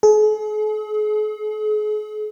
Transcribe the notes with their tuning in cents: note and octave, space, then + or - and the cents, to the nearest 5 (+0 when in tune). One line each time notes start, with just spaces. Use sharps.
G#4 +45